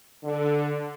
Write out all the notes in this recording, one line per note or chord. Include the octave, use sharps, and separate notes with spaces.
D3